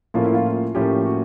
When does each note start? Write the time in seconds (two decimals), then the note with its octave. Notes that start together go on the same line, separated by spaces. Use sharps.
0.14 A2 F3 A#3 C#4 F4
0.24 E4
0.35 F4
0.75 A2 F3 A#3 C#4 G4
1.05 F#4